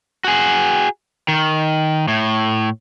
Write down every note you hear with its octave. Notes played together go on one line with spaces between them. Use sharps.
F#4 G#4
D#3
A2